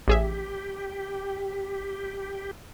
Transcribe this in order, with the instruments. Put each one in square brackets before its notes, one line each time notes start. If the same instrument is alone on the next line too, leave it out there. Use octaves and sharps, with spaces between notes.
[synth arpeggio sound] A1 G#4 E5 [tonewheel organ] G4